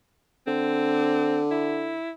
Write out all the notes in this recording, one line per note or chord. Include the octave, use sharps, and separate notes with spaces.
D3 C4
E4